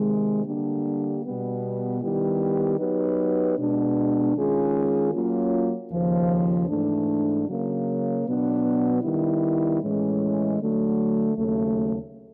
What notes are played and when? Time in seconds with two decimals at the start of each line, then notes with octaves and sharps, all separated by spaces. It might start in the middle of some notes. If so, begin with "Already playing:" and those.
Already playing: C3 D#3 G#3
0.45 D3 G3 A#3 D4 G4
1.24 B2 G3 B3
2.01 D#3 G3 B3 E4 G4
2.79 F#3 B3 D#4 G4 B4
3.57 B2 G#3 B3 D4
4.35 D#3 G#3 C#4 F4 G#4
5.13 F#3 A#3 C#4 F4
5.91 D#2 C#3 F3
6.68 G#2 E3 A3 D4
7.47 C#3 F#3 A#3
8.24 B2 F#3 B3 D4
9.02 D#3 G3 B3 E4
9.81 A2 E3 G#3 C#4
10.59 D3 F#3 A3
11.36 D#2 C#3 F#3 A3